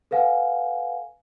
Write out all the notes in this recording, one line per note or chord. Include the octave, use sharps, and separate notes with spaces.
A4 B4 F5 F#5 G#5